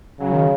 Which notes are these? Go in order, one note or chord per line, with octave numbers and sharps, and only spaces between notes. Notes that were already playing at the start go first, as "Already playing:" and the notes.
C#3 F#3
D#3